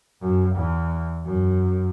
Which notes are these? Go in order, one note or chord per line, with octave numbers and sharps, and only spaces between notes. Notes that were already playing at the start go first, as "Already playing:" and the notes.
F#2
E2
F#2